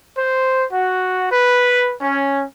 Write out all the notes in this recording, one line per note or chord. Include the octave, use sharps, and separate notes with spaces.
C5
F#4
B4
C#4